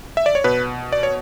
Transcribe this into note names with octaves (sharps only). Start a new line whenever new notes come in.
E5
D5
C#5
B2 B4
D5
C#5